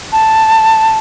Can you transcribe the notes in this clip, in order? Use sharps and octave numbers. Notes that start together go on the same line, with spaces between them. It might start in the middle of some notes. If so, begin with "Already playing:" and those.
A5